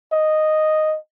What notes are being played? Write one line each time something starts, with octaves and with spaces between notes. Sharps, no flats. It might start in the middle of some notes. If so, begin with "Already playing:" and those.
D#5